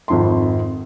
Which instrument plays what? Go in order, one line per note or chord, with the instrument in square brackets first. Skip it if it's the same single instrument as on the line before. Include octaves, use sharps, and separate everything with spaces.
[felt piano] G#1 F2 C6